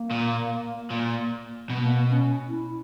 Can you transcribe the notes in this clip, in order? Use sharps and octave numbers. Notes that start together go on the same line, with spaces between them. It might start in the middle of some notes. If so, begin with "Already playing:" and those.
Already playing: A#3
A#2
A#2
B2 B3
A#3
B3
C#4
E4